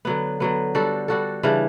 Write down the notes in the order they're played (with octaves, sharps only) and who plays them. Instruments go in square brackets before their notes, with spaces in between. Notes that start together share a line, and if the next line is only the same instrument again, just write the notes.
[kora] D3 F#3 B3
D3 F#3 B3
G3 D4 F#4 A4
G3 D4 F#4 A4
C#3 E3 G3 D4